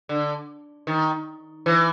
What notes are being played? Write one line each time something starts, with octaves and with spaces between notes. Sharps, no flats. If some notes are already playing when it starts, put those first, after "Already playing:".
D3
D#3
E3